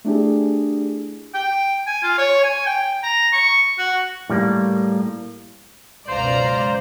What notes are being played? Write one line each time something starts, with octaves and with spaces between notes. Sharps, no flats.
A3 D4 E4 G4 G#4
G5
G#5
F4
C#5
G#5
G5
A#5
C#6
F#4
A2 G3 A#3
C#2 F#2 B2 C5 D5 F5 A#5